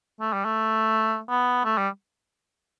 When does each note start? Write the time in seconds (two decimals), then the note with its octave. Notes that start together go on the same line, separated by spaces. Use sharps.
0.21 A3
0.33 G3
0.45 A3
1.29 B3
1.65 A3
1.78 G3